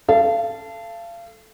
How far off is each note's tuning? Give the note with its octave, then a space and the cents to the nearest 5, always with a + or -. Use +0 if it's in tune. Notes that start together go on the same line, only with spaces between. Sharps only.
A4 +0 F5 -35